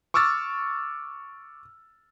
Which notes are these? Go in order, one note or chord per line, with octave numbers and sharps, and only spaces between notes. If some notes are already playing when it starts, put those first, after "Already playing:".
C#6 D6 E6 F6 A6